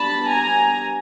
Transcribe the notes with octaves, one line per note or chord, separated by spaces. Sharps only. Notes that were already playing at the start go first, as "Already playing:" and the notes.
Already playing: G3 B3 D4 A5 B5
G#5 A#5